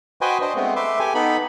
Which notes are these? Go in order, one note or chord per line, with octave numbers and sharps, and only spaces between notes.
F#4 B4 C5 D#5 G5 G#5
D4 C5 D#5
G#3 A3 B3 C4
A3 B4 E5 C6 D6
G4 A4 G#5
B3 D#4 A4 B5